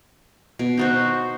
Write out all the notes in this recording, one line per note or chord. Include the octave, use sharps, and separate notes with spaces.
B2
D#4 F#4 C5